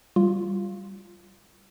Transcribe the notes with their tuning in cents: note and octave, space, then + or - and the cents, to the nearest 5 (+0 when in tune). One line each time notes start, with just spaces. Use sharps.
G3 +0 F4 +0